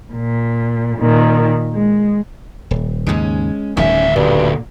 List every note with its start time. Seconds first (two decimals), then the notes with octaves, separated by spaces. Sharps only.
0.14 A#2
0.98 A#2 D#3
1.74 G#3
2.71 D#1
3.07 D#2 G#2 C#3 G#3 C#4
3.77 D1 B1 D#3 G3 C#4 E5
4.16 D2 G2 A#2